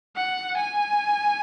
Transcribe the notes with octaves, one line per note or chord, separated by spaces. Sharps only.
F#5
G#5